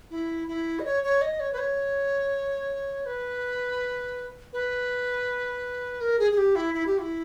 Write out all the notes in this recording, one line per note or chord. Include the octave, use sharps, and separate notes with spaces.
E4
E4
D#5
C#5
C#5
D#5
C#5
B4
C#5
B4
B4
A#4
G#4
G#4
G4
E4
E4
G4
E4